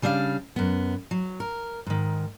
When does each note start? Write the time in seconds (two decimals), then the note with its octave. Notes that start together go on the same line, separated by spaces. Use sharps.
0.02 C#3 G3 D4 D#5 F5
0.56 F#2 B3
1.11 F#3
1.40 A#4
1.86 G#2 D#3